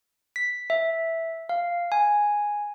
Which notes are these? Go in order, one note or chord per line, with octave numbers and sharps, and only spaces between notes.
B6
E5
F5
G#5